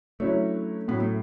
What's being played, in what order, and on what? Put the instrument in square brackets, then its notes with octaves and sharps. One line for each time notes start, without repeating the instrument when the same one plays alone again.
[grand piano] D3 F#3 C#4 E4 [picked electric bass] A3
[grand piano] A2 F#3 C#4 [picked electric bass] B3
[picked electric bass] A3